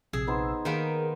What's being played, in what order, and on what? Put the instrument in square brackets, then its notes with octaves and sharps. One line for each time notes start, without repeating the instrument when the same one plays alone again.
[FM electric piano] A#1 C3 E6 [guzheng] G#4
[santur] B3 D#4 C5
[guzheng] D#3 A#3 B4 [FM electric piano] G#4 A#4 [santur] G5